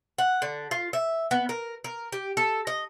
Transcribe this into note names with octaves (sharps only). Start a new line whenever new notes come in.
F#5
D3
F4
E5
B3
A#4
A#4
G4
A4
D#5